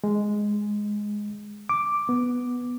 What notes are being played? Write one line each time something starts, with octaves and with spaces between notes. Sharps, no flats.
G#3
D6
B3